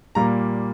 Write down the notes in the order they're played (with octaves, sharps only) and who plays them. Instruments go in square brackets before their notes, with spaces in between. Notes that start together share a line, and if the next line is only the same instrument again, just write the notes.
[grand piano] A#2 G3 A#3 A#5